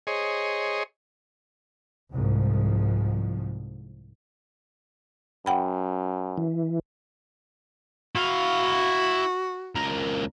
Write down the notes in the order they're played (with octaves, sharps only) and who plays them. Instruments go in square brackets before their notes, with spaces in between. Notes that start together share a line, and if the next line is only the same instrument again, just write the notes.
[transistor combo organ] G#4 C5 C#5 D#5
[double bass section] C2 G#2 F3
[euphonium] F#2 [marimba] F#5 G5 B5
[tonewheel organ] E3
[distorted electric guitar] E4 F5 [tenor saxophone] F#4
[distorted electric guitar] C#2 A#4